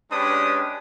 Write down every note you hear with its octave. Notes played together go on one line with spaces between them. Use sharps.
G#3 C#4 D4 G4 B4 D#6